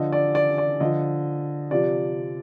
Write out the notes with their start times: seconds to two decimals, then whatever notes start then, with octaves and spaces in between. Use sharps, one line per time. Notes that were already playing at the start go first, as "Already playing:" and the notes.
Already playing: D3 F3 D#5
0.12 D5
0.35 D5
0.58 D5
0.80 D3 F3 D#5
1.71 C3 F3 D5